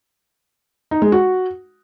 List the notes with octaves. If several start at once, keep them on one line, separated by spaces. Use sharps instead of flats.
D#4
G#3
F#4